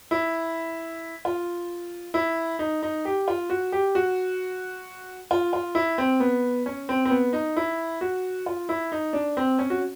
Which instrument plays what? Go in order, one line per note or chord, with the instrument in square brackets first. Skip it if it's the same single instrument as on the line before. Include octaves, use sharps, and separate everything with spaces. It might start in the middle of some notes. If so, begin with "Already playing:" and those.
[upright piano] E4
F4
E4
D#4
D#4
G4
F4
F#4
G4
F#4
F4
F4
E4
C4
B3
C#4
C4
C4
B3
D#4
E4
F#4
F4
E4
D#4
D4
C4
C#4
F#4